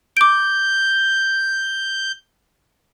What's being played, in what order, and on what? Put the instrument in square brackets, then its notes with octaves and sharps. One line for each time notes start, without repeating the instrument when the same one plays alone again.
[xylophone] D6 D7 [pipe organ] G6